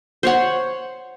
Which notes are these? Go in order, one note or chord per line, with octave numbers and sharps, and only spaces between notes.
C5 C#5 F#5